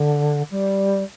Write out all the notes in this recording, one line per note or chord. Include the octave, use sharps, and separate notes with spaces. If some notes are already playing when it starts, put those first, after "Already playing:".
Already playing: D3
G3